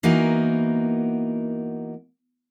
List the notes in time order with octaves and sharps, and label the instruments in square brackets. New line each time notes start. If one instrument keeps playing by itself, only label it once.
[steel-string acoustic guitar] E3 A#3 B3 D#4 F#4 A#4